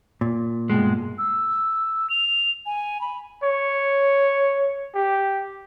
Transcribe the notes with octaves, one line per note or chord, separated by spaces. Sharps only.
A#2
G2 B2 G#3
E6
F7
G#5
B5
C#5
G4